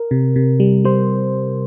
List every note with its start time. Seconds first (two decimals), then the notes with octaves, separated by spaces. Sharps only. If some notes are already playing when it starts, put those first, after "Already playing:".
Already playing: A#4
0.11 C3
0.36 C3
0.60 G3
0.85 G3 C5